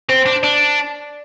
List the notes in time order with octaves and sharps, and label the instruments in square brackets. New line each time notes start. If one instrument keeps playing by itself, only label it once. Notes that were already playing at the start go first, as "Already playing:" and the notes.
[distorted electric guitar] C4 [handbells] C5
[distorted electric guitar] D4
[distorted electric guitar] D4 [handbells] D5